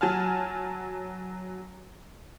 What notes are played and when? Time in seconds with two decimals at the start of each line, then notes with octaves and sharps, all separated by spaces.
0.01 F#3 G#5 A5 F6